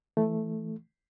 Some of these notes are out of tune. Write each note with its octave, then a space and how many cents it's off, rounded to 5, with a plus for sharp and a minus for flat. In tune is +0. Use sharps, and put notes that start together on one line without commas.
E3 +5 A3 +0